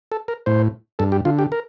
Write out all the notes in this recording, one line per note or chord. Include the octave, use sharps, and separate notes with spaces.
A4
A#4
A2 C5
G2 A4
G4
D3 F4
G4
A#4